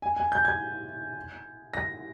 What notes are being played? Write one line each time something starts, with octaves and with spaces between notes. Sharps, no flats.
G#5
G#5
G6
G#6
A#6